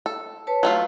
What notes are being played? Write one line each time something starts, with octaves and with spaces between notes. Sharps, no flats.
A4
B4 C#5 A5
F#3 A3 F4